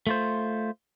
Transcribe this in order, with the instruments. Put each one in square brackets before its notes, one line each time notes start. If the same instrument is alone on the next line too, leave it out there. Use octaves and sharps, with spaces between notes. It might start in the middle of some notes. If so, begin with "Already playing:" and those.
[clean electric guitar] A3 F4 C5